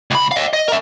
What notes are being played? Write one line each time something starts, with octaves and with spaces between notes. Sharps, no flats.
C#2 B5
D#5 F5
D#5
A#4 E5